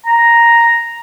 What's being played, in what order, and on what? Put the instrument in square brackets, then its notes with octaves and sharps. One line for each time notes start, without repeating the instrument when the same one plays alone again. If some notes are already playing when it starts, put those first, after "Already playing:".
[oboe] A#5